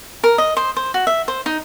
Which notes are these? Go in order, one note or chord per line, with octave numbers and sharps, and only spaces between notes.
A#4
D#5
C5
C5
F#4
E5
C5
D#4